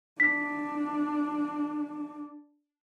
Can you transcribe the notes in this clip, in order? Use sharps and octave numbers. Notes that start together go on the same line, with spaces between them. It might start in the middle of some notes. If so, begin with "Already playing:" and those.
D4 B6